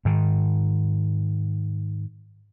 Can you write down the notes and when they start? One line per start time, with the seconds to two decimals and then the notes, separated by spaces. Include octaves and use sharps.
0.05 G#2 D#3